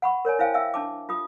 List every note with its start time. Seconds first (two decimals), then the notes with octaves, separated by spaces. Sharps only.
0.02 F#5 B5 C#6
0.25 A#4 C#5 D5 G#5
0.39 E4 C5 F5 G5 G#5
0.54 E5 F5 G5 E6
0.74 D4 A5 D6
1.09 F4 G4 D#6